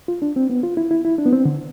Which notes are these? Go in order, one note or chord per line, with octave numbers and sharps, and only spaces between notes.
F4
D4
C4
B3
F4
E4
E4
E4
D4
B3
C4
D3